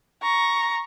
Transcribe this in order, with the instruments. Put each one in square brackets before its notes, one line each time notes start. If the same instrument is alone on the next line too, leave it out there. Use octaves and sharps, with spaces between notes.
[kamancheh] A#5 C#6